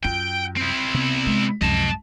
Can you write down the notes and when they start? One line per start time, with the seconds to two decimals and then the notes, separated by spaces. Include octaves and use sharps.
0.05 F#2 F4 G5
0.57 C4 E4
0.94 C3 B3
1.26 G#3
1.61 C#2 F#2 C3 F3 D#5 A5